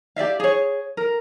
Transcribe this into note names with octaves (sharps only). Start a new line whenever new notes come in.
G4 D5 E5 F5
G#4 C#5
A#4